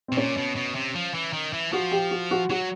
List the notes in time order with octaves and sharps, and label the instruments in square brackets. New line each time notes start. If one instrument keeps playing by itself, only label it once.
[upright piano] C4
[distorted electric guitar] B2
[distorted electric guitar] A#2 [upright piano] C#4
[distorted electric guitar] B2
B2
C3
F3
E3
D#3
E3
[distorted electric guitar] F3 [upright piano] F#4
[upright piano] G4
F#4
F#4
[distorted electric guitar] F#3 [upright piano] F#4